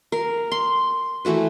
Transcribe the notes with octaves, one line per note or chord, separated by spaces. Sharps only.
A#4
C6
E3 A3 F#4 B4